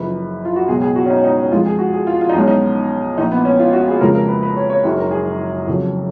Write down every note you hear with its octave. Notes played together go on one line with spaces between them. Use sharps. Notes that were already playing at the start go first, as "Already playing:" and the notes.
Already playing: F#1 F#2 C#3 F3 B4
F4
F#4
C#2 B2 F#3 G#4
G#4
F#4
C#4
D#4
C#4
D#4
C#4
F2 F3 G#3 F4
G#4
F#4
G#4
F4
F4
D#4
B1 B2 G#3 C#4
D#4
A#1 A#2 F3 D#4
B3
C#4
F4
F#4
G#4
F2 C#3 F3 G#3 A#4
A#4
B4
B4
C#5
C#5
F#1 F#2 D#3 F#3 G#4
A#4
G#4
F#1 F2 C#3 F#3